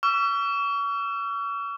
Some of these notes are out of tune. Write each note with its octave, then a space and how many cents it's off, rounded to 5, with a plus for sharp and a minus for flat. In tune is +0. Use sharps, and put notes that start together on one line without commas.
C#6 +40 E6 +45